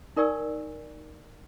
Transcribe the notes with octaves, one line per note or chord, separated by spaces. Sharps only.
D#4 A#4 D5 G#5 C#6 E6